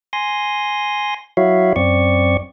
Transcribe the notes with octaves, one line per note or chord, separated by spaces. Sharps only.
G#5 C6 A#6
F#3 E4 F#4 C#5 E5 F5
F#2 C4 D5 C#6